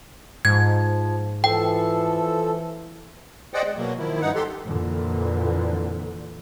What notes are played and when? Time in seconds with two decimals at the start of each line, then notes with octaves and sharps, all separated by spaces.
0.45 G#2 F3 G#6
1.44 E3 F3 A4 G5
3.54 G#4 C5 D5 D#5 F#5 G5
3.65 G#3
3.77 B2 F#3 A#3
3.98 D#3 F3 E4
4.21 G2 D#4 F#5
4.35 G4 A4 C6
4.64 F2 A#2 D3 E3